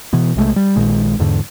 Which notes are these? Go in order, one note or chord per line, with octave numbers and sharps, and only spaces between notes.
B2 E3 B3
B1 C3 G#3 A3
G3
A#1 A#2 D#3 G#3
E2 G#2 D3